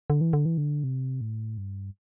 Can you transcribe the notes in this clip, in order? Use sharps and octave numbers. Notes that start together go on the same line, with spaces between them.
D3
E3
D3
E3
D3
C3
A2
G2